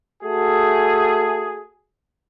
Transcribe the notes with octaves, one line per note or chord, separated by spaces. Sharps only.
A3 F#4 G#4